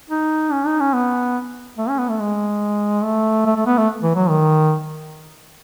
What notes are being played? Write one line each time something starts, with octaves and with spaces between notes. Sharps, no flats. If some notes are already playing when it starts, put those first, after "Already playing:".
D#4
C#4
D#4
C#4
B3
A3
C#4
B3
A3
G#3
A3
A3
A3
B3
A3
E3
F#3
D#3